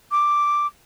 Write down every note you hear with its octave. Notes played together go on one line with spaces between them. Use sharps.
D6